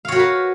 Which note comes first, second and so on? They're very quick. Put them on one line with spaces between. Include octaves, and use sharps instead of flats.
F5 C#5 F#4 A#4 B4